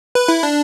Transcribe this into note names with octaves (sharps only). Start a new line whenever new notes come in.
B4
E4
D4